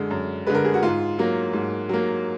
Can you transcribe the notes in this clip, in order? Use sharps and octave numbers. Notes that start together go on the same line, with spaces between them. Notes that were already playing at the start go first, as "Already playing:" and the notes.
Already playing: F#2 D3 G#3
F#2
D3 G#3 B4
A#4
G#4
F#4
G#2 F4
F#3 A#3
G#2
F#3 A#3